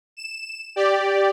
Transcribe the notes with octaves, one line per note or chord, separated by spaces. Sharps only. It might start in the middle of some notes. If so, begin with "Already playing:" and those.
E7
G4 D5